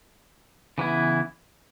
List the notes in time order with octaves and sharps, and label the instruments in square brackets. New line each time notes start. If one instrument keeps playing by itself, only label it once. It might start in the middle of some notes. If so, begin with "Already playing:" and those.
[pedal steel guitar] C#3 E3 B3 E4